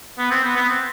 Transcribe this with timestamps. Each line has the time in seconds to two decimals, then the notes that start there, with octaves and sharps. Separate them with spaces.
0.19 B3
0.31 C4
0.44 B3
0.56 B3
0.69 C4